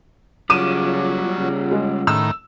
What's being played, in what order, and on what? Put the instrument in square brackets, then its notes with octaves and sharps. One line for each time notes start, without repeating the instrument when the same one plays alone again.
[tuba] C#3 [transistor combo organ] F#3 [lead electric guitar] G3 F4 [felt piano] D6 D#7 E7
[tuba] C#3
[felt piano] G#3
[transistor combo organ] A2 D#3 [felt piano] E6